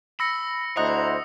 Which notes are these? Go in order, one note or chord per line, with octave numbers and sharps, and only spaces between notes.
B5 E6 A#6 C#7
D2 E4 C5 D#5 F#5 A#5 D#6 F#6